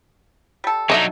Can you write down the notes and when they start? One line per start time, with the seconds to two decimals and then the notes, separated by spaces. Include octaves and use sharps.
0.64 G3 A4
0.90 D3 F#3 D#4 D#5 E5